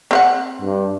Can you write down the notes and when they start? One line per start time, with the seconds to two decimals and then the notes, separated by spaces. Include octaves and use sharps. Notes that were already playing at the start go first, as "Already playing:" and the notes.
0.11 C4 F5 F#5
0.62 G2